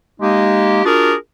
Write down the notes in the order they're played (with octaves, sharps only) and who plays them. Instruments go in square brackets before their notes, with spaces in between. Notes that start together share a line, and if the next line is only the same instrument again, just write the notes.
[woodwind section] G#3 A#3 D#4 G4
D4 F4 F#4 G#4 A#4